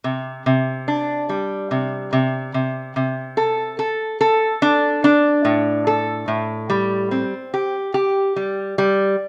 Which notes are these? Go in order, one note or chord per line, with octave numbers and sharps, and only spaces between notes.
C3
C3
D4
G3
C3
C3
C3
C3
A4
A4
A4
D4
D4
A2
A4
A2
G3
C4
G4
G4
G3
G3